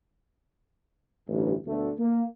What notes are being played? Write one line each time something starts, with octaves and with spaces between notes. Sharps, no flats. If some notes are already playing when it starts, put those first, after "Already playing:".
A1 D2 G2
D2 B2 D3 A3
A#3